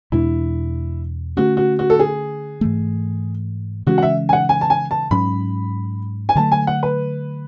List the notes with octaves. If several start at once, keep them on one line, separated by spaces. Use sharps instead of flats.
E2 B2 G#3 D4 E4
D3 A3 C#4 F#4
F#4
F#4
A4
G#4
G#2 E3 A3
C#3 E3 G#3 C#4 F#4
F#5
E5
G#5
F#5
G#5
A5
G#5
A5
G#2 F#3 C#4 B5
G#5
D3 F#3 A3 A5
G#5
F#5
B4